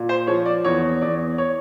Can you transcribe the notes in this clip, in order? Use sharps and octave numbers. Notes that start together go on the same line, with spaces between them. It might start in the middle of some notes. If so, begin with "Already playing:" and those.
Already playing: A#2
C5
F3 C#5
D5
E2 C#5
E2 D5
C#5